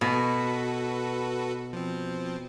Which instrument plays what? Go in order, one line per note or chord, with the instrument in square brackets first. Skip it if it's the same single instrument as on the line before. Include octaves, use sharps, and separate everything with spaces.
[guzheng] B2 [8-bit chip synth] F#4 A4 B4
[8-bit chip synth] F3 C4